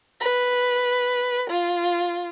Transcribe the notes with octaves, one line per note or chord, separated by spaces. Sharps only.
B4
F4